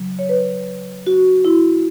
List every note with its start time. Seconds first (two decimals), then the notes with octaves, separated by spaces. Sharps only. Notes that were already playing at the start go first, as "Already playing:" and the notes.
Already playing: C#3 F#3
0.19 C#5
0.29 B4
1.07 F#4
1.45 E4